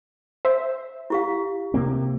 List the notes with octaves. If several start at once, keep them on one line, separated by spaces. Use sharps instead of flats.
C5 E5
E4 G4 F5
C3 A#3 C4